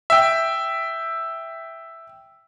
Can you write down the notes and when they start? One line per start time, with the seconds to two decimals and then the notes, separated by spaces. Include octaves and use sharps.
0.10 E5 G5